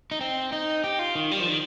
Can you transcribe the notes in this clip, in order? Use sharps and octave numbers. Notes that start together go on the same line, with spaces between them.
D#4
C4
D#4
G4
F4
D#3
G3
F3
D#3